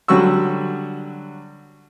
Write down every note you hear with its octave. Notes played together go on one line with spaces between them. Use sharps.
D3 F#3 G3 F#4 C#6 E6